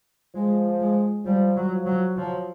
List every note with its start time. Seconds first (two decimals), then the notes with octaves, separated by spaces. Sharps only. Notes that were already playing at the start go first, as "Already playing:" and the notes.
0.35 F3 G#3
0.80 G#3
1.25 F3 G3
1.56 F#3
1.72 F3
1.86 F#3
2.17 F3 F#3